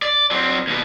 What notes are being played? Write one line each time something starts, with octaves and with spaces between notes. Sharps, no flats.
D5
F#3 C4
D#2 B2